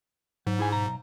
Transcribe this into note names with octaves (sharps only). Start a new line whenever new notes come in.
G#2 F#3
E4 G#4 G#5
B1 A#5